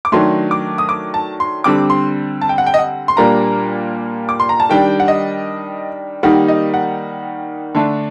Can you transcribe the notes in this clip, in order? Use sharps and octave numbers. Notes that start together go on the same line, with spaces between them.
D6
D#3 F#3 A3 D4 C6
D6
D#6
D6
A5
C6
D3 G3 C4 D6
C6
A5
G5
F#5
G5
D#5
F#5
C6
A#2 G3 A#3 D4 A#5
D6
C6
A#5
A5
D#3 G3 D4 G5
F#5
D#5
D#3 G3 A#3 D#4 F#5
D#5
F#5
D3 A3 D4